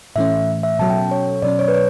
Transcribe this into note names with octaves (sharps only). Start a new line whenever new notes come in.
A2 E3 A3 C#4 E5
E5
B2 F#3 C#4 F#4 A4 A5
G5
C#5
B2 F#3 C#4 D5
C#5
B4
C#5